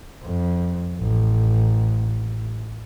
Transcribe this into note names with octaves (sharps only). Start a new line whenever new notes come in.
F2
A1